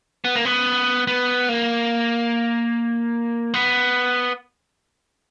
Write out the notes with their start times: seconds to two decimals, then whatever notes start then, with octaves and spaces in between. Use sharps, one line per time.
0.25 B3
0.36 A#3
0.45 B3
1.07 B3
1.49 A#3
3.54 B3